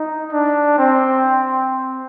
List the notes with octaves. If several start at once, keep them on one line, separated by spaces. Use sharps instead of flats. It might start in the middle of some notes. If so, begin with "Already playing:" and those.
Already playing: D#4
D4
C4